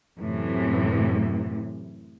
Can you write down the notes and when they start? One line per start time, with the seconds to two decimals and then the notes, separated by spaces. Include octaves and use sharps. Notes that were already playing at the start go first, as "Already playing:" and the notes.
0.18 F#2 A2 C3 E3